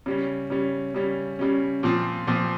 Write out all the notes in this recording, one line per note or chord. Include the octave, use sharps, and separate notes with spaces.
C#3 G3 C#4
C#3 G3 C#4
C#3 G3 C#4
C#3 G3 C#4
A#2 F3 C4
A#2 F3 C4